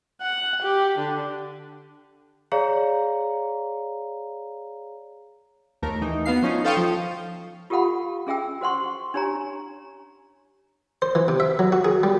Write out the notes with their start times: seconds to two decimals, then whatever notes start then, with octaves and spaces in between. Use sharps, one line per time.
0.22 F#5
0.62 G4
0.98 D3
2.52 G#4 C#5 D5 F5 A#5
5.82 D#2 A3 A#4
6.02 E3 D#4
6.26 B3 F#4 F5 C7
6.42 F3 C#4 D#4
6.64 A4 C5 F5 G5 C#6 D#6
6.77 F3
7.70 F4 G4 A4 F5 F#5 B5
8.27 C#4 G#4 E5 G5 E6
8.61 F#4 C5 F#5 C6 C#6
9.14 D4 G4 C#5 G#5 A#5
11.02 C5
11.15 E3
11.28 C3
11.40 E5
11.59 F#3
11.72 F#4
11.85 G#4
12.03 G3